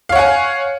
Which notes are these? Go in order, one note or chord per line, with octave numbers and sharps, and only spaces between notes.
C#5 F5 F#5 G#5